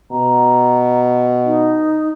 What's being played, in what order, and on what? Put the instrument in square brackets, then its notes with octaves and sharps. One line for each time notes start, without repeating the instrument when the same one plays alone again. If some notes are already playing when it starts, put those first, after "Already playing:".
[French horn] B2 [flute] A#5
[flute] D#4